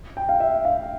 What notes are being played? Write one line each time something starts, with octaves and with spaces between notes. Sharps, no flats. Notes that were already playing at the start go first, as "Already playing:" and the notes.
G5
F5
E5
F5